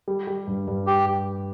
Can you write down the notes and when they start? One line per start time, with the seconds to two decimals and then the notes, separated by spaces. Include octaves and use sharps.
0.08 G3
0.27 G3
0.47 G2
0.68 G2
0.87 G4